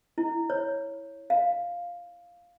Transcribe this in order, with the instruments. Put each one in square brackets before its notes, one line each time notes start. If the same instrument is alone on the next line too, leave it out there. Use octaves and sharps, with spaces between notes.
[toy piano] E4
C#5
F5